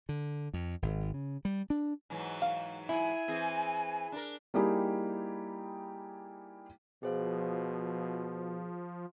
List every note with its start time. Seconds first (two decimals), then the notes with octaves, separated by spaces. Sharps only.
0.09 D3
0.54 F2
0.82 G#1
1.14 C#3
1.45 G3
1.70 D4
2.10 G#2 E3 F#3
2.42 F5
2.89 E4 G#5
3.28 E3 C4 G#4
4.12 D4 A#4
4.54 G3 A#3 D#4 E4 G4 G#4
7.03 B2 F3 G#4 C5 F5